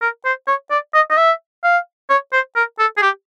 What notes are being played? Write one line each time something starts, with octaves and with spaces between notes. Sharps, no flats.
A#4
C5
C#5
D5
D#5
D#5
E5
F5
C#5
C5
A#4
A4
G#4
G4